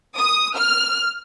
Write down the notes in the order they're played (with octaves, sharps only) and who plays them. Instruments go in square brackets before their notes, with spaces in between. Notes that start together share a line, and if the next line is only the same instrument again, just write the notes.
[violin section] D#6
F6